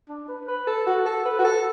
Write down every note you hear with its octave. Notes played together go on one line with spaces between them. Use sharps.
D4
B4
B4
A4
F#4
A4
B4
F#4
A4